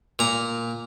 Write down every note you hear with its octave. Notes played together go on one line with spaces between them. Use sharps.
A#2 A#5